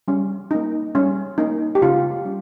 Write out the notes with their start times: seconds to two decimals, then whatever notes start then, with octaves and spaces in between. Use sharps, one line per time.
0.08 G3 C#4
0.51 A#3 C#4 D#4
0.95 G3 C#4
1.38 A#3 C#4 D#4
1.75 G4
1.82 C#3 F4
2.25 G3 C#4